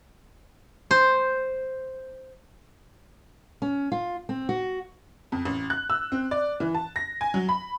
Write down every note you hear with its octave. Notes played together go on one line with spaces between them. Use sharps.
C5
C#4
F4
C4
F#4
F2
A1
F#6
E6
C4
D5
E3
A5
A#6
G#5
F#3
B5